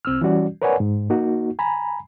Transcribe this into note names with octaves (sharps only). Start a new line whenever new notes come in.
C2 C4 E6 F6
E3 G3 C#4 F#4 D5
A#4 B4 C#5 D5 F#5 G#5
G#2
A#3 D#4 F#4
G#5 A#5 B5